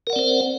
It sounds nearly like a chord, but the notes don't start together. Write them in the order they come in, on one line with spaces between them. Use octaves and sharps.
A#4 F#5 D5 C4 C5